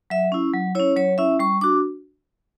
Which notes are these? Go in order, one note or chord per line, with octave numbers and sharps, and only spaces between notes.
F#3 E5
C#4 E4
F#3
C#4 E4 C#5
F#3 C#5
C#4 E4 E5
G3 C#6
D4 F#4 D6